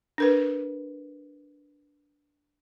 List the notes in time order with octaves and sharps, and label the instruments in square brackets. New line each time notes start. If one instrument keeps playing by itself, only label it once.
[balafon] D4 A#4 B4